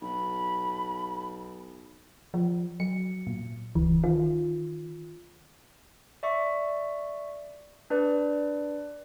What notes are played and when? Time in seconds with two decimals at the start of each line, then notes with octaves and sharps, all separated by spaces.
0.01 B1 B5
2.34 F3
2.80 F#3 C#7
3.27 A#2
3.75 D1 C#2 E3
4.04 D#3 F4
6.23 D5 E5 C#6
7.90 D4 B4 D5